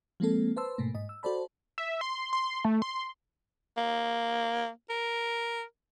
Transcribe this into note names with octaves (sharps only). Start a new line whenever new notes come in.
F3 G#3 A#3 C4 A4
B4 C5 A5 C6 E6
G#2 B2 A3 A#3
G#2 D#5
E6
F#4 A4 C5 D5 A5 B5
E5
C6
C6
A3
C6
A#3
A#4